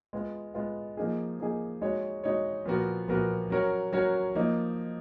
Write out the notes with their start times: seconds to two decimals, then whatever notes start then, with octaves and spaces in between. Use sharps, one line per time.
0.13 G#3 B3 F4
0.54 G#3 B3 F4
0.97 F3 A#3 D#4 G#4
1.40 F3 A#3 D#4 G#4
1.81 G#3 D#4 F#4 C#5
2.24 G#3 D#4 F#4 C#5
2.65 A#2 F3 B3 F#4 A#4
3.08 A#2 F3 B3 F#4 A#4
3.50 F#3 C#4 F#4 A#4 C#5
3.92 F#3 C#4 F#4 A#4 C#5
4.35 F3 A#3 D#4